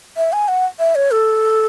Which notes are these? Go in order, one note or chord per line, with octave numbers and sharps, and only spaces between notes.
E5
G#5
F#5
E5
C#5
A4